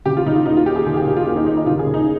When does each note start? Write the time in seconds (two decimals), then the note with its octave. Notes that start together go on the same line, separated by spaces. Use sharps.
0.05 C#3 G4
0.17 F4
0.26 C#3 D#4
0.36 F4
0.46 D#2 D#4
0.57 F4
0.66 D#2 G4
0.76 G#4
0.86 C#3 G#4
0.97 G4
1.06 C#3 F4
1.16 F4
1.27 D#2 F4
1.36 D#4
1.47 D#2 D#4
1.57 D#4
1.66 C#3 F4
1.79 G#4
1.87 C#3
1.94 D#4